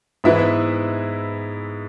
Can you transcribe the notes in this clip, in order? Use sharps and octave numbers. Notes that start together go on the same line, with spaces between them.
G#2 E3 B3 E4 B4 E5